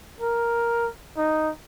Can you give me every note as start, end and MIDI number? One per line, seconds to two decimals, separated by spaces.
0.21 0.87 70
1.17 1.50 63